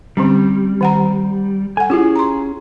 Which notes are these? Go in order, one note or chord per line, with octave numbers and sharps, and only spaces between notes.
D3 G3 C4 C#4
D#3 F#5 A#5
A4 F#5 G#5
C#4 E4 F4 G4 G#4
A#5 C6